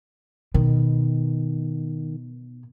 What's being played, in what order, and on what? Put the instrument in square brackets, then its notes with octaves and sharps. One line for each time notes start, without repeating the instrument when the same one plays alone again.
[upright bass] B2 [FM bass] D#3